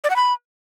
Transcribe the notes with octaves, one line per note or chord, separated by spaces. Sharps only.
D5
F#5
B5